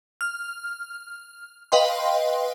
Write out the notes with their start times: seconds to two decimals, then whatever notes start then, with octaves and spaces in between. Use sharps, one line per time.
0.21 F6
1.72 B4 D#5 F5 G5 C6